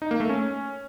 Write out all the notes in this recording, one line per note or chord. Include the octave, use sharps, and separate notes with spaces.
D#4
A#3
A3
C#4